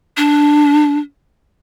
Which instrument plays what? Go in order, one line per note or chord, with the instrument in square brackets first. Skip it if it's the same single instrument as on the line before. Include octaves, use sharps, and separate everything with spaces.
[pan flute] D4